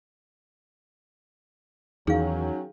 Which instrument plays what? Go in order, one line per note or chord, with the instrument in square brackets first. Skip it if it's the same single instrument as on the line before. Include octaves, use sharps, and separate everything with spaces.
[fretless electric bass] E2 [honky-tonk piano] D#3 [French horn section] F#3 C#4 [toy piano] G#4 F5